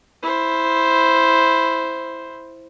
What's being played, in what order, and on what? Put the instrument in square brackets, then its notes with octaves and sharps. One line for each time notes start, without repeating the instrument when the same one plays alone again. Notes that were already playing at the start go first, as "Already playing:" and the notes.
[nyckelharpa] E4 C5